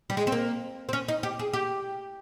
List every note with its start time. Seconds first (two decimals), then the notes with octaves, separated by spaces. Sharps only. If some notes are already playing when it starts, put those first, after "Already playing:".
0.10 G3
0.17 G#3
0.27 C4
0.32 A#3
0.89 C4
0.93 C#4
1.08 D#4
1.23 G4
1.39 G#4
1.53 G4